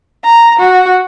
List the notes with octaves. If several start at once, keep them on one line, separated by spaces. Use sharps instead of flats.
A#5
F#4